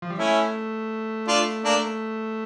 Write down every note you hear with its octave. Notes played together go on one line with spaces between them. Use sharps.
F3
G3
A3 C#4 E4
D4 F4
A#3 D4